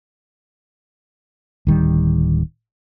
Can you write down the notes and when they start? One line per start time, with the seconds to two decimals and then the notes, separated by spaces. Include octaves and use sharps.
1.67 D1 D#3 G3